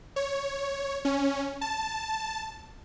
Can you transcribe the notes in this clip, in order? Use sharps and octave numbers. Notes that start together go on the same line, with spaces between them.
C#5
C#4
A5